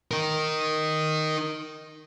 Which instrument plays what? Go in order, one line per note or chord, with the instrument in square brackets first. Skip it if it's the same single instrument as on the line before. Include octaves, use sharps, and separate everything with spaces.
[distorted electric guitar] D#4 A#4